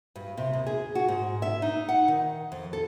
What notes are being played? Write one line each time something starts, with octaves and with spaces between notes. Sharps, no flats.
G2
C3
D#2
G#4
F#4
G#2
E5
D#4
F#5
D#3
F2
A4